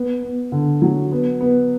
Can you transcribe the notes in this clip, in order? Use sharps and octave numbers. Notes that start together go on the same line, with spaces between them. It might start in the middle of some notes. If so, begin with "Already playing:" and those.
Already playing: B3
B3
D3
F#3
B3
B3